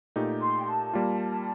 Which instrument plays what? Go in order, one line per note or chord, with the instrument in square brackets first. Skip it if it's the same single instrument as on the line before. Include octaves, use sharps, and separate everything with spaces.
[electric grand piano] A#2 A3 D#4 G4
[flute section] C6
G5
A5
[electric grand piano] G3 A#3 F4